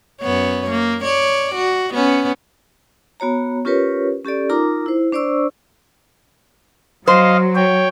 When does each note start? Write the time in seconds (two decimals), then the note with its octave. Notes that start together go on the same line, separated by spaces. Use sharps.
0.21 F#2 B3 C#5
0.71 A#3
1.04 C#5 D5
1.55 F#4
1.94 B3 C#4
3.20 B3 F#4 C#5 A#5
3.65 C#4 F4 G4 A#4 B4 C#5
4.24 C#4 G4 A4 D5
4.49 D#4 F4 A#4 A#5 D6
4.86 E4 C5
5.12 D4 C5 D5 C#6 E6
7.07 F#3 C5 D#5 F5
7.55 C#5 G5